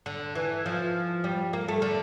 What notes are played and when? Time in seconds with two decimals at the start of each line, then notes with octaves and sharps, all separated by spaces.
0.06 D3
0.35 E3
0.66 F3
1.24 G3
1.53 A#3
1.68 A3
1.82 D3